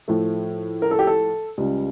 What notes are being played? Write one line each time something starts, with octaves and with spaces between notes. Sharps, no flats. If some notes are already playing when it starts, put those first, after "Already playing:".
A2 F3 A3
A#4
A4
G4
A4
C#2 C#3 G3